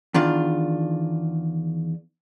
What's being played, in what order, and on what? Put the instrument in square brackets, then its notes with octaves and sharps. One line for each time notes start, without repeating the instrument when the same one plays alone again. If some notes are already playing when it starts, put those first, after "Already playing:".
[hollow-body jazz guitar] E2 D#3 D4 F4